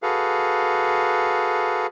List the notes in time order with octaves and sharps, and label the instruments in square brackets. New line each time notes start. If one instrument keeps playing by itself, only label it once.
[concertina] F#4 G#4 A4 B4 F5